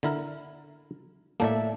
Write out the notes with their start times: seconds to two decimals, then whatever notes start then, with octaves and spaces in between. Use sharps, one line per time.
0.03 D3 E4 A#4
1.40 A2 A#3 A4 D5 E5